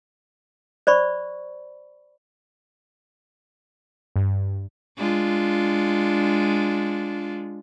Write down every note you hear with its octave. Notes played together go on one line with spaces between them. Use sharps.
C5 D5 B5 C#6
G2
G#3 D4 F4